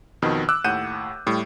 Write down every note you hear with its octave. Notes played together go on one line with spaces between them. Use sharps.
F2 B2 D#3
D6 E6 F#6
D#2 A2 F#5 G6 D#7 E7
A2 G3